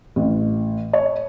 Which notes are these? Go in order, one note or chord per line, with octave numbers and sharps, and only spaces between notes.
A1
C#5